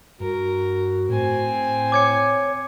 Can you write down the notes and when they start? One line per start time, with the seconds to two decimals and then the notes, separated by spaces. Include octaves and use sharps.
0.20 G2 F#4 A#4
1.09 A2 C4 G#5
1.92 C#5 D6 G#6 C#7